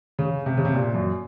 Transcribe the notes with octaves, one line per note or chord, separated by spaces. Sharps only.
C#3
C3
C#3
C3
A#2
F#2